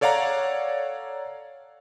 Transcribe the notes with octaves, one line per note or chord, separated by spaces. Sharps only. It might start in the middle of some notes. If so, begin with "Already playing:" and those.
A4 C#5 D5 F5 F#5 A#5